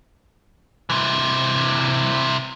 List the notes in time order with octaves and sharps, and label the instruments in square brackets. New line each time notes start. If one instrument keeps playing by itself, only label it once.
[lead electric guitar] C3 E3